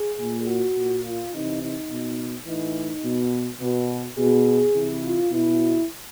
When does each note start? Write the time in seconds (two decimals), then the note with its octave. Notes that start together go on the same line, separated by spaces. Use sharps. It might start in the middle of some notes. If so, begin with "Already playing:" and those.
Already playing: G#4
0.19 A#2
0.47 F#4
0.77 A#2
1.04 F4
1.33 C3 E3 D#4
1.61 D#4
1.90 B2
2.46 A2 E3 D#4
3.04 B2
3.61 B2
4.18 B2 G#4
4.74 C3 E3
5.03 F4
5.31 B2 E4